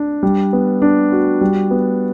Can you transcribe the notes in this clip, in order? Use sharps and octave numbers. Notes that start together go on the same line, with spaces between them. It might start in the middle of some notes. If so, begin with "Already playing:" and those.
Already playing: D4
G3
B3
D4
F#4
G3
B3